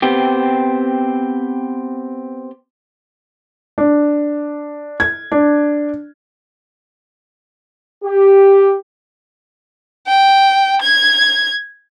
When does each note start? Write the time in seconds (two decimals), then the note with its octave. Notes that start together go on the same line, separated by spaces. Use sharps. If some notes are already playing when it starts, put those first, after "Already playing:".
0.02 B3 C4 G4
3.78 D4
5.00 G#6
5.32 D4
8.05 G4
10.07 G5
10.82 G#6